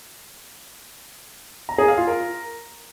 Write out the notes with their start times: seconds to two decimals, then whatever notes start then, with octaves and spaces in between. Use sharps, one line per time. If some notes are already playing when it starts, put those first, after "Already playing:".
1.69 A#5
1.78 G#4
1.88 F5
1.98 F4
2.07 A#4